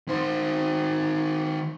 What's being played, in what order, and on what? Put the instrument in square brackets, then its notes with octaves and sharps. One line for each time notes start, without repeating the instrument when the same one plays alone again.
[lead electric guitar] D#3 C5